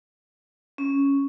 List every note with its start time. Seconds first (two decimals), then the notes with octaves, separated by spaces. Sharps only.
0.78 C#4